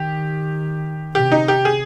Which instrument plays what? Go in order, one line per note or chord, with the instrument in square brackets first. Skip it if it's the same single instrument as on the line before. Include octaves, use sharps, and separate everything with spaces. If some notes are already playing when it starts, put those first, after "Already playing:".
Already playing: [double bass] D#3 [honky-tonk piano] G4
[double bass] C3 [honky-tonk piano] G4
[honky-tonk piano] D#4
G4
G#4